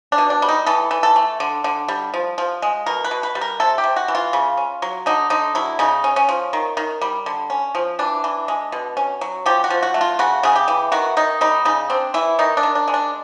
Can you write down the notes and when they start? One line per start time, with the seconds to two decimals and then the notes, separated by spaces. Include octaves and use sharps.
0.12 D4
0.18 B2
0.30 D4
0.42 G3
0.49 D#4
0.66 E3 A4
0.91 E3
1.03 A4
1.16 A3
1.40 D3
1.64 D3
1.88 G3
2.14 F3
2.38 F3
2.62 G#3
2.86 B2 A#4
3.04 B4
3.11 B2
3.23 B4
3.35 G3
3.41 A#4
3.60 C3 A4
3.78 G4
3.84 C3
3.96 F#4
4.08 E3
4.15 F4
4.33 C#3
4.57 C#4
4.82 F#3
5.06 D3 D#4
5.30 D3 D#4
5.55 F#3 E4
5.79 C#3 D#4
6.04 C#4
6.16 C#4
6.29 F3
6.53 D#3
6.77 D#3
7.01 G3
7.26 D3
7.50 C#4
7.75 F3
7.99 E3 D4
8.24 E3
8.48 G#3
8.72 B2
8.97 C#4
9.21 F#3
9.46 F3 G4
9.64 F#4
9.70 F3
9.83 F#4
9.94 A3
10.01 F4
10.19 C#3 F#4
10.43 C#3 G#4
10.56 G4
10.68 E3
10.92 D#3 F#4
11.17 D#3 D#4
11.41 G3 D#4
11.65 C#3 D#4
11.90 C4 D4
12.14 E3 E4
12.39 D#3 D#4
12.57 D4
12.63 D#3
12.75 D4
12.88 G#3
12.94 D4